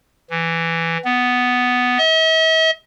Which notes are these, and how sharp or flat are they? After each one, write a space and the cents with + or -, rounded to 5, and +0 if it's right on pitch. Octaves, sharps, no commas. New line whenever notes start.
E3 +10
B3 +5
E5 -45